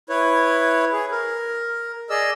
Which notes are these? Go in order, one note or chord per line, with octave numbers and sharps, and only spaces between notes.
E4 B4 C#5
G#4
A#4
G#4 D5 D#5 E6